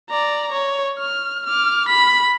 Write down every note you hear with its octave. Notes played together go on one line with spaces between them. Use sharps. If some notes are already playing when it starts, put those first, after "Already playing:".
D5 A#5
C#5
F6
D6 F6
B5 B6